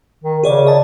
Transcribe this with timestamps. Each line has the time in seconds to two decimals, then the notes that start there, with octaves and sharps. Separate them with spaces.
0.24 D#3
0.43 C#3 G#4 C#5 D5
0.67 D#5 A5